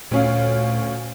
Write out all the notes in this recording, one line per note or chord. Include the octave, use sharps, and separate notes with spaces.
D2 A#2 C#4 F5